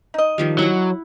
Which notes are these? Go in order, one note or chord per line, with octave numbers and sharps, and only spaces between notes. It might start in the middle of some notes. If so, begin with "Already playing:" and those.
D#4 D#5
D#3 F3 G3
F#3 E4 F#5